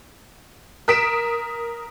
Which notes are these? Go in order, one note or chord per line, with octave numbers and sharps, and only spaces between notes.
A#4 D#6 B6 D7 E7